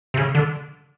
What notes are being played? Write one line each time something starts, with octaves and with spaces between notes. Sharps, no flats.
C3
C#3
D3